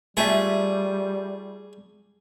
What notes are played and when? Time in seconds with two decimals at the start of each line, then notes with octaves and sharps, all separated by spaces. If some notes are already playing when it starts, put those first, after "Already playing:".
0.17 G3 A3 F4 G#4 E5